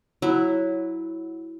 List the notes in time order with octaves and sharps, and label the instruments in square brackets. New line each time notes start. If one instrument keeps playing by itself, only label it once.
[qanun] F#3 E4